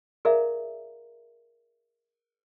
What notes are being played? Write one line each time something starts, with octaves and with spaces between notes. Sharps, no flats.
G#4 A#4 D5 E5 F5 A#5